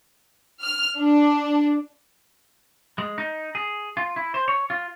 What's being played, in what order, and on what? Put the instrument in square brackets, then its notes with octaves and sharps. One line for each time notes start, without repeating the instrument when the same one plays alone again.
[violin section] F6
D4
[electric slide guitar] G#3
D#4
G#4
F4
E4
C5
C#5
F4